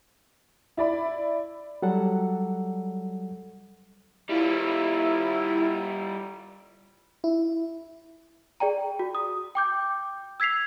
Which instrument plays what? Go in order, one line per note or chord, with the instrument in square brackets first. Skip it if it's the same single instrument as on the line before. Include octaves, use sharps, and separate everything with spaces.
[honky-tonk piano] E4 D5 B5
[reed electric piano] F#3 G3 A4 F#5
[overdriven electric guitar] G3 F4 [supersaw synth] E4
[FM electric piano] E4
[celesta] G#4 D5 G5 A#5
F#4
D#6
G5 D6 G6
E6 G#6 B6 C7 F7